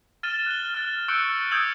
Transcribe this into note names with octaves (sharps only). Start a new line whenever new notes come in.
F6 A6 D#7 E7 G7
F#6 G7
F6 A6
C#6 E6 F#6 G6 C#7 D7
D#6 E6 G6 G#6 D7 F#7